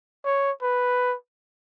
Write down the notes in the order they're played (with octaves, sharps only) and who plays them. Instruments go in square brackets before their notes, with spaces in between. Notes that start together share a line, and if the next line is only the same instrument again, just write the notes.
[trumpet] C#5
B4